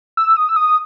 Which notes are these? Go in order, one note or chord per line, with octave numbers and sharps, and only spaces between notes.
E6
D#6
E6
D#6